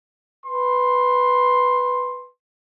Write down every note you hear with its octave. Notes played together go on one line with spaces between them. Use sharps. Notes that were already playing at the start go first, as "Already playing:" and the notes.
B4 C6